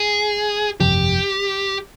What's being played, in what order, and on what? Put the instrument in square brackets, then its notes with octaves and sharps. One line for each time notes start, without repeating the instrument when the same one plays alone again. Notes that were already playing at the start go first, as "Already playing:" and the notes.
Already playing: [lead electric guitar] G#4
[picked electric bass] G1 F2 C3 F3 [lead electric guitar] G4